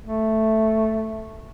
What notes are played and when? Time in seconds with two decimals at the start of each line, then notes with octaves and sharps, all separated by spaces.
0.04 A3